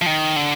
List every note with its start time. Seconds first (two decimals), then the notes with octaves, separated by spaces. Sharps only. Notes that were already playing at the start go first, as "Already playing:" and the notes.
0.02 F3
0.06 D#3
0.36 D3